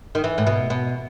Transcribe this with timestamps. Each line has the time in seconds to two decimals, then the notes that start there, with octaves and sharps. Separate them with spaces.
0.15 D#3
0.24 E3
0.38 A2
0.47 B2
0.70 B2